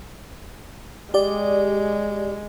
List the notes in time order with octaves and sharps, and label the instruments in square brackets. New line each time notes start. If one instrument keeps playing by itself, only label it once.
[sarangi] G#3 [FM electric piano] G4 D5